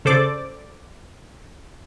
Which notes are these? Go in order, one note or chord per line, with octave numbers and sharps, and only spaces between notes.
C#3 A4 C5 D5 D6